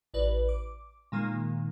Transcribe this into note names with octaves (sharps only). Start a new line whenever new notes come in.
A1 B4 D5
D6
A#2 D#3 G#3 A#3